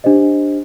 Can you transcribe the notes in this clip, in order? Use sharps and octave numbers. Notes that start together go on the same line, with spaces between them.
D4 G4 C5 D#5